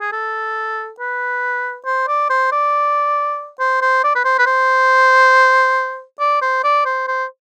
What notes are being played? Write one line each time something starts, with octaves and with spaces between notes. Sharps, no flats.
G#4
A4
B4
C5
D5
C5
D5
C5
C5
D5
B4
C5
B4
C5
D5
C5
D5
C5
C5